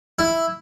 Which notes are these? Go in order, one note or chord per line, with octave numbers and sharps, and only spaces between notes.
E4